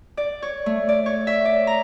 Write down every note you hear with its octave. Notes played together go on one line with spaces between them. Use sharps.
D5
C#5
A3
D5
C#5
E5
D5
A#5